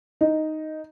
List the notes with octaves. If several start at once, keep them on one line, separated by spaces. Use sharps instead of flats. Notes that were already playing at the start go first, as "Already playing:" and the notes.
D#4